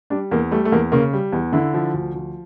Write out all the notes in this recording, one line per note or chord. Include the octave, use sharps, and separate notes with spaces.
G3 D4
E2 A#3
G3 A3
A3
E2 A#3
C#3 A#3
G3
E2
D3 E4
F3
D2
F3